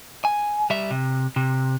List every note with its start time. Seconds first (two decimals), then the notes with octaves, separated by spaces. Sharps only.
0.25 G#5
0.70 G3 E5
0.91 C3
1.36 C3